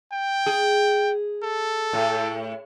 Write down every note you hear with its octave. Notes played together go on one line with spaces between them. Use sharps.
G5
G#4
A4
A2